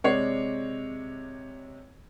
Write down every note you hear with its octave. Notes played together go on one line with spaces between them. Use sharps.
C3 G#3 C#5 D5 C7